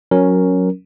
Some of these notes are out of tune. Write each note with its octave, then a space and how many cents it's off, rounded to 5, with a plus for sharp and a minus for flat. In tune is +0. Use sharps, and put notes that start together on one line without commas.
F#3 -10 C#4 +0 A#4 +0